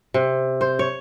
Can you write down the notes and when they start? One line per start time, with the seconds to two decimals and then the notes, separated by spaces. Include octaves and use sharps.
0.14 C3
0.61 C5
0.79 C#5